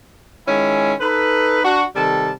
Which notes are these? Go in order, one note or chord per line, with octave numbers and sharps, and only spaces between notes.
D#3 G#3 C#4 E4 G#5
D#4 A4 B4
D4 F#4
C3 D#3 G3 A4 A5